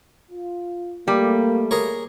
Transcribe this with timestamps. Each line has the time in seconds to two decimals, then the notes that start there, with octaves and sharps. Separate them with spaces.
0.31 F4
1.08 G3 A3 A#3
1.71 G#4 A#4 C#5